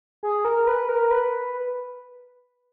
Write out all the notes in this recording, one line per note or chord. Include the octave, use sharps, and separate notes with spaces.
G#4
A#4
B4
A#4
B4